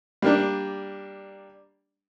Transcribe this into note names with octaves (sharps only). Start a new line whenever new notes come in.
G3 A#3 D4